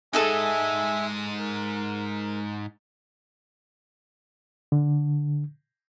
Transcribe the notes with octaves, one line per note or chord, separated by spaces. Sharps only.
G#2 G#3 D#4 G#4 A4 E5 G#5
A#4
D3